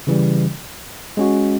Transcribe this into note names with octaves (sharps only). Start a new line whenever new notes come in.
C#3 E3 G3
G#3 C#4 F#4